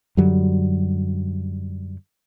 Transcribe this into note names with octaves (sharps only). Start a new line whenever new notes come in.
F#2 D3 F#3 G3